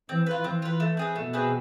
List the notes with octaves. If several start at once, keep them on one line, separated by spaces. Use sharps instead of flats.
E3 C4
F4 B4
E3 C4
F4 B4
A3
C4 G#4 B4
B2 A3
C4 G#4 B4